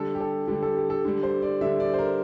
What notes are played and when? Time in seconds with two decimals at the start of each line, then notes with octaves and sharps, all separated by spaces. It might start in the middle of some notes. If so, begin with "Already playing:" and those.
Already playing: D3 G3 A4
0.15 G4
0.21 A4
0.48 D3 G3 G4
0.63 A4
0.77 G4
0.90 A4
1.05 D3 G3
1.23 C5
1.42 D5
1.61 D3 G3 E5
1.80 D5
1.94 C5
1.99 A#4